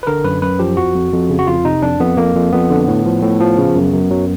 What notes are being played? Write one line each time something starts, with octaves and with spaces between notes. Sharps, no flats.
B4
D3 A#4
F#2 B4
F#2 B4
F3 G4
F2 F#4
F2
F2
C#3
F#4
F2 F4
C3 D#4
F2 D4
F2 B3
F2 A#3
F2
F2 B3
D3
A2
F3
A2
F3
C#3
F#2
F#2
F#3